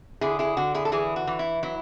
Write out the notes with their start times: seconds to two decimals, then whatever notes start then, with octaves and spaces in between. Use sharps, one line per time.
0.21 D3 E4 G#4
0.39 E4 G#4
0.57 D3 F#4
0.74 E4 G#4
0.85 A4
0.92 E3 E4 G#4
1.16 F#4
1.27 E3
1.39 E4
1.63 F#3 E4